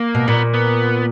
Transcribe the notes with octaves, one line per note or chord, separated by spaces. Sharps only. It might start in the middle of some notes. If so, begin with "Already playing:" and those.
Already playing: A#3
B2
A#2 B3
B3